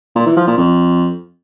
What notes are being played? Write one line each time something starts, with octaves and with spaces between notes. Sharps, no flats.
A#2
E3
F3
A#2
F2